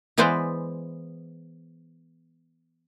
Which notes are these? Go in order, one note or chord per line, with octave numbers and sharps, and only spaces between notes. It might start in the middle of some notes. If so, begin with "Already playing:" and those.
E3 G#3 B3 B4 C5 D5